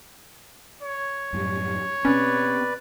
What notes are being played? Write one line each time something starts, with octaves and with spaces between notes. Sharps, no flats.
C#5
F#2 A2 G3
B2 C4 C#4 B4 D5